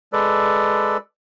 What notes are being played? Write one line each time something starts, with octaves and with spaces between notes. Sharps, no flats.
G#3 A4 B4 D5